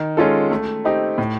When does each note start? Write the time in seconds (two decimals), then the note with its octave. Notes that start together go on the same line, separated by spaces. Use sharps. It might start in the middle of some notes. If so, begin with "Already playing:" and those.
Already playing: D#3
0.17 G#3 C#4 F4 A4
0.51 A3
0.85 C4 D#4 G4
1.18 A2